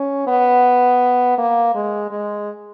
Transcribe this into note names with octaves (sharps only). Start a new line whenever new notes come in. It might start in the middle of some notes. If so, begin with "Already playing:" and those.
Already playing: C#4
B3
A#3
G#3
G#3